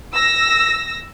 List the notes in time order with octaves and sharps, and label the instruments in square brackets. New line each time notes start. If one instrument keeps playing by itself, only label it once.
[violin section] E6 A#6